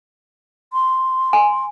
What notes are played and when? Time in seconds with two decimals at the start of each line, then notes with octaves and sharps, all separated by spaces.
0.73 C6
1.33 G#5